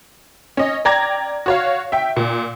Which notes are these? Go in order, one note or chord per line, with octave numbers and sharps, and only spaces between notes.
C#4 D#5
D5 G5 A#5 G#6 A#6
F#4 C#5 F5
E5 G5
A#2